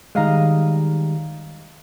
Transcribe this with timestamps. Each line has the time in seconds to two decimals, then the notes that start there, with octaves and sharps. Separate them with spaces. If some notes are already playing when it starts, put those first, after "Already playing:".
0.15 D#3 G3 G#3 D#5 F5 A#5